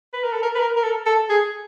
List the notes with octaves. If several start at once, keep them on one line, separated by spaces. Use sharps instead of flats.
B4
A#4
A4
A#4
B4
A#4
A#4
A4
A4
G#4